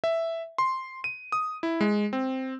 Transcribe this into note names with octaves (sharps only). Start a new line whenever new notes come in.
E5
C6
D#7
D#6
E4
G#3
C4